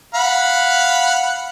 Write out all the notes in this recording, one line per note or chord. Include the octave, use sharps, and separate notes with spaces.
F5 F#5 B5